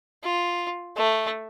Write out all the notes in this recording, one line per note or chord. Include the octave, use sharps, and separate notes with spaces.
F4
A3